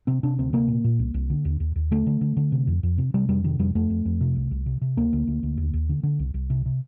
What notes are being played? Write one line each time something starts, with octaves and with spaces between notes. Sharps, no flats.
C3 C4
C3 D4
D2 C4
C3 A#3
A#2
A#2
C2
C2
D3
D#2
D#2
D#2
D3 A3
D3
D3
D3
C3
F2
F2
C3
C3 G3
F2 G3
C3 D#3
F2 G3
F2 A3
F2
F2
C3
C2
C2
C3
C3
D2 A#3
D2
D2
D2
D#2
D#2
D3
D3
C2
C2
C3
C3